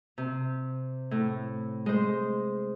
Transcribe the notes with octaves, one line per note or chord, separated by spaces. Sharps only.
C3
A2
G#3 C5